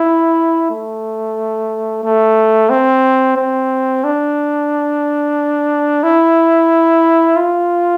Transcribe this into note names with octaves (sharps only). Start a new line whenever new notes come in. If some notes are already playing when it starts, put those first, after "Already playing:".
Already playing: E4
A3
A3
C4
C4
D4
E4
F4